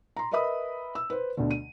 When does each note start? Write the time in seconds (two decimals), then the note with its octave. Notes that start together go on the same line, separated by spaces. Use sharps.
0.17 A#5 C6
0.31 A#4 B4 D#5 E5 B5 D#6
0.95 E6
1.10 B4 C5
1.37 D2 B2 D3
1.51 D#7